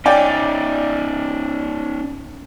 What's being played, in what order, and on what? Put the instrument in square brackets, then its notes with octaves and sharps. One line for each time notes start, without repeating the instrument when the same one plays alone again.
[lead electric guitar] C#4 D#4 [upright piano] D5 G5 G#5